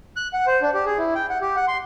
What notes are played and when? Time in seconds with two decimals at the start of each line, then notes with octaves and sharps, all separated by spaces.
0.16 F#6
0.33 F#5
0.47 C5
0.62 D4
0.74 G4
0.86 G#4
0.98 E4
1.15 G5
1.30 F#5
1.41 G4
1.56 F#5
1.68 C6